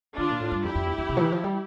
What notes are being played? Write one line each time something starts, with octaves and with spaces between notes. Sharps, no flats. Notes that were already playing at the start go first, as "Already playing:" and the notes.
D3 D4 F4
A#2
A2
G2
F2 E4 G4
F2
E2
F2
C3
F3
E3
F3
G3